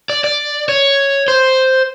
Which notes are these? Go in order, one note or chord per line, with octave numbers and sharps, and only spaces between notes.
D5
D5
C#5
C5